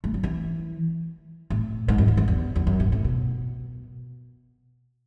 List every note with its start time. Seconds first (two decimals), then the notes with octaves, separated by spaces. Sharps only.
0.04 A3
0.14 F#3
0.23 E3
1.50 A2
1.88 G#2
1.98 F#2
2.08 E2
2.17 F#2
2.28 E2
2.56 E2
2.67 F#2
2.80 G#2
2.92 A2
3.04 B2